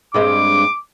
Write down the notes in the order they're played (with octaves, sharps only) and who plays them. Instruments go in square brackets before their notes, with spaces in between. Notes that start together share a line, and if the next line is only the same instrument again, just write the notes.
[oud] G2 G#3 C4 [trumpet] D6